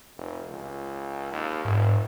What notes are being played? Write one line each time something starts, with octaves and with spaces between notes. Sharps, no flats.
F1
C#2
D#2
F1 G#2